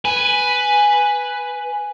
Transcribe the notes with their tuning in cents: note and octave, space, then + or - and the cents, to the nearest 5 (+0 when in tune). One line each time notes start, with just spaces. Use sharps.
B4 +0 G#5 +0